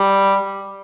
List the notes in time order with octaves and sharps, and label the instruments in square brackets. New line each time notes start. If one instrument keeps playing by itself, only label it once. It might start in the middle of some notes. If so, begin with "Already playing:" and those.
Already playing: [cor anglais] G3